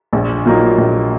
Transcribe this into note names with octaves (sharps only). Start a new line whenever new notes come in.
A#1
A#2 F#3 A#3 D#4
A#1